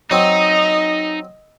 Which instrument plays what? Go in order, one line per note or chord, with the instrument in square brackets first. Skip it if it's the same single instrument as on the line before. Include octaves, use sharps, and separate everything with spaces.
[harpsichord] F#3 C4 [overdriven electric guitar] D#4 [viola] D#5